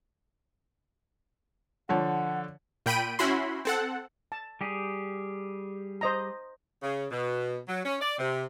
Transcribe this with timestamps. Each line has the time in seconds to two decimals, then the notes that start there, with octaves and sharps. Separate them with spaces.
1.89 D3 F3 C#5 F#5
2.86 A#2 G5 B5 D7 D#7
3.19 C#4 E4 F#4 B5 C6
3.65 C4 A4 F#5
4.32 A5
4.61 G3 G4 G#4
6.01 C5 D#5 A#5
6.82 C#3
7.11 B2
7.68 F#3
7.85 C#4
8.01 D5
8.18 C3